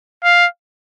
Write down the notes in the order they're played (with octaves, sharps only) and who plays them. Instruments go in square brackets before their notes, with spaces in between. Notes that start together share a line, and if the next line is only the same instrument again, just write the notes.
[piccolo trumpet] F5